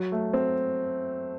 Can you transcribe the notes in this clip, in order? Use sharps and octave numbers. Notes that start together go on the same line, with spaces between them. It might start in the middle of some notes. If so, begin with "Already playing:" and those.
Already playing: F#3
A3
C4